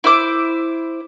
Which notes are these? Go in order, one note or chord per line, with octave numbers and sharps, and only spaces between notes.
E4 C5 D6